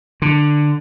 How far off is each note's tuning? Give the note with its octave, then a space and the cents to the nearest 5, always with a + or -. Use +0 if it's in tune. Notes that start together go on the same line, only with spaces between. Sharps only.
D3 +10